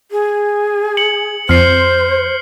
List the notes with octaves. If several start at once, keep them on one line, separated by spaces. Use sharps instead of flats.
G#4
C#7 F#7
F2 C5 F6 C7